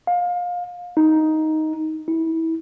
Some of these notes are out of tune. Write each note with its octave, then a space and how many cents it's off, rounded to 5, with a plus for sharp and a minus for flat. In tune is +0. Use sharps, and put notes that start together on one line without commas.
F5 +25
D#4 +5
E4 -25